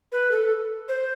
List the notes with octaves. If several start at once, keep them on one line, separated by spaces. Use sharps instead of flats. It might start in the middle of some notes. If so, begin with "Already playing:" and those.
B4
A4
C5